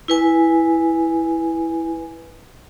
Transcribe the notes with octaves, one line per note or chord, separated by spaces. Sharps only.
E4 B4 G#5